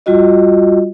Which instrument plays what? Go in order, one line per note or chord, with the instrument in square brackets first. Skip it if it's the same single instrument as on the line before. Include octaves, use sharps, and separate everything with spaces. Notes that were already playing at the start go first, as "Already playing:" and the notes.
[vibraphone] G3 F4 F#4 D#5